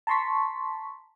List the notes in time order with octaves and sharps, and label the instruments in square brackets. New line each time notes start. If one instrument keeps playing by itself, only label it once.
[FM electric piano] A5 A#5 C6 C#6 B6